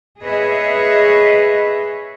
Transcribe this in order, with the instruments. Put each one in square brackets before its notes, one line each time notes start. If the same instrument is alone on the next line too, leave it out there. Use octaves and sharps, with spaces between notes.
[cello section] G#4 B4 C#5 D#5 E5